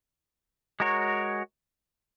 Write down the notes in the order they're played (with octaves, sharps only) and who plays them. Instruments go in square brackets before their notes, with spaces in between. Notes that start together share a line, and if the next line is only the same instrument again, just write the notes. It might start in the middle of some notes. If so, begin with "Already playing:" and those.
[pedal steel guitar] G#3 F#4 A#4 C#5